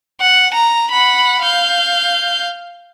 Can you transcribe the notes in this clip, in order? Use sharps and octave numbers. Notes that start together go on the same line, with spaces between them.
F#5
A#5
F#5 B5
F5 G6